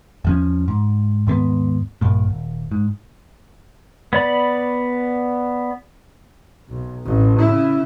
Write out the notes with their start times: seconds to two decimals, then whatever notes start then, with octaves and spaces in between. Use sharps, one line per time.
0.25 E2 F3 C#4
0.68 G#2
1.27 D#2 G#2 A3 B3
2.01 A#1 G2 A#2
2.29 D#1
2.71 G#2
4.13 B3 D5 B5
6.69 B1
7.05 A1
7.40 C#3 E4